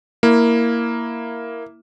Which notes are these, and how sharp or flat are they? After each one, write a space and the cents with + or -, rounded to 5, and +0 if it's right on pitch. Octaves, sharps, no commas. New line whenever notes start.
A#3 +0 E4 +0